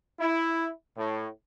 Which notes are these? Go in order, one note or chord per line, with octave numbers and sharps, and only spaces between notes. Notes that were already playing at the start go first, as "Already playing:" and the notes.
E4
A2